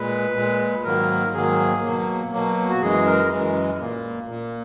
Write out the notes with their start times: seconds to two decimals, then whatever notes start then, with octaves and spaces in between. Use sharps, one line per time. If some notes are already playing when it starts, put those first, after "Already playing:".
Already playing: A#2 G#3 B4
0.36 A#2 G#3
0.84 G#2 D#3 F#3 A#3 A#4
1.34 G#2 D#3 F#3 A#3 G#4
1.83 B2 F#3 A#3
2.33 B2 F#3 A#3
2.70 F#4
2.82 F#2 E3 G#3 G#4
3.06 A#4
3.31 F#2 E3 G#3
3.80 A#2 A#3
4.29 A#2 A#3